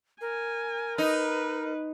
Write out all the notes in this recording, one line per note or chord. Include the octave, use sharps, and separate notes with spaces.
A#4 G#5
D#4 B4